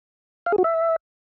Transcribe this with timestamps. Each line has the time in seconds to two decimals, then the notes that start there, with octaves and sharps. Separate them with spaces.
0.46 F5
0.52 G#4
0.58 F#4
0.64 E5